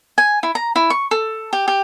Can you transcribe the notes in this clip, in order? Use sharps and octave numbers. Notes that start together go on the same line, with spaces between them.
G#5
E4
A#5
E4
C#6
A4
G4
G4